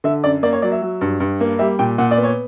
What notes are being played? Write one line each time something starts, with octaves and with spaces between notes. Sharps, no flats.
D3 E5
F#2 D5
A#3 D5
C#5
F#3 D5
E5
F#3
G2
G2
A#3
G3 E5
A#2 G5
A#2 F#5
D5
B3
C#5